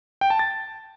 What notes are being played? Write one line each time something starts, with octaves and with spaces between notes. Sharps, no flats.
G5
A5
A6